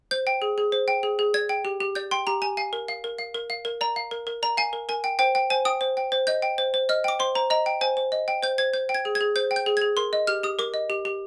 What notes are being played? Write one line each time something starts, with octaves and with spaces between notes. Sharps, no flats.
C5 G6
G5
G#4
G#4
C5
G5
G#4
G#4
D5 G#6
G5
G4
G4
D5 G6
G5 C6
G4 A#5
G4 G#5
F5 G#5
A#4
F5
A#4
F5
A#4
F5
A#4
D5 A#5
F5
A#4
A#4
D5 A#5
F5 G#5
A#4
A#4 G#5
G5
C5 G5
G5
C5 G#5
G5 D#6
C5
G5
C5
D#5 G6
G5
C5
C5
D#5 F6
G5 D6
C5 C6
C5 A#5
D#5 A#5
G5
C5 G#5
C5
D#5
G5
C5 G6
C5 G#6
C5 G6
G5
G#6
G#4
G#6
G#4
C5 G6
G5
G6
G#4
G#4 G#6
A#4 C6
D#5
G4 F6
G4 D#6
A#4 D6
D#5
G4
G4